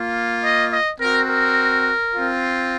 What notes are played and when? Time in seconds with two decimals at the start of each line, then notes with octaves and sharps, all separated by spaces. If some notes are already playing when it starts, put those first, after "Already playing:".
Already playing: A#3 F4
0.44 D#5
0.72 D#5
1.01 C4 F#4 A#4
1.30 A#4
2.14 C4 F4